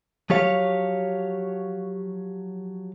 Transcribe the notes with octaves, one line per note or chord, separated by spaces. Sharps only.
F3 F#3 G4 C#5 F5